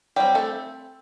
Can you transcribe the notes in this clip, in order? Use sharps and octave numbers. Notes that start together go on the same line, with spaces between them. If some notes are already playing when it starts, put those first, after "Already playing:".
F#3 G3 C4 G4
A3 A4